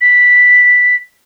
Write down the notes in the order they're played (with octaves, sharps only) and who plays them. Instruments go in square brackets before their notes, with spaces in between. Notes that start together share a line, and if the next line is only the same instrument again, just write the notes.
[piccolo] B6